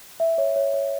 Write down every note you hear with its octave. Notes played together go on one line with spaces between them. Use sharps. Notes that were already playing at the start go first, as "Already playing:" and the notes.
E5
C#5
C#5
C#5